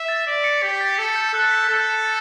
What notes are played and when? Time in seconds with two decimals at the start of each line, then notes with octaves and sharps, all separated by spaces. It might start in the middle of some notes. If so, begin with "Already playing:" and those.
Already playing: E5
0.08 A6
0.27 D5 B6
0.44 A6 C#7
0.62 G4 B6
0.81 A6
0.97 A4 A6
1.16 G6
1.29 E6
1.34 A4 F#6
1.51 B6
1.69 A4 G6
2.05 A6